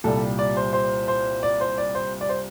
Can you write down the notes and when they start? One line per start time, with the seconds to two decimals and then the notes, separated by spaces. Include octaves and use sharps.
0.04 C2 A#2 G3 A4
0.39 D5
0.57 C5
0.73 C5
1.08 C5
1.43 D5
1.61 C5
1.78 D5
1.95 C5
2.21 D5
2.29 C5